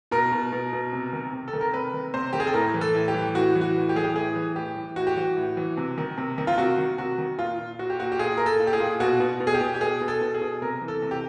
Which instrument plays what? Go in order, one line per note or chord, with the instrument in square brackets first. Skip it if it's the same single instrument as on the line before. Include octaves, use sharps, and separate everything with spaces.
[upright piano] B2 A#4
B2
B2
B2
C3
D#3
C3
A4
D#3
A#4
C3 B4
D#3
C3 C5
D#3 G4
G#4
A4
A2 A#4
E3
A4
A2
G4
E3
A2 F#4
E3
F#4
A2
G4
E3 G#4
G4
A2 G#4
E3
A2 G4
E3
A2 F#4
G4
E3 F#4
A2
E3
C3
D#3
C3
D#3
F4
C3 F#4
D#3
C3 F#4
D#3
A#2 F4
A#2
A#2 F#4
G4
A#2 F#4
G4
A#2 G#4
A#2 A#4
A4
A#2
G4
G#4
A#2
B2 F#4
B2
B2
G#4
G4
B2
G4
B2 G#4
B2
A4
B2
G#4
B2
C3 A#4
E3
A4
C3
G4